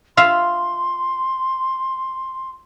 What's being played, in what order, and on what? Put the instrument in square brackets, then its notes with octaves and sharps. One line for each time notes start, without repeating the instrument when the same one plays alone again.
[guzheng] F4 E5 F5 [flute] C6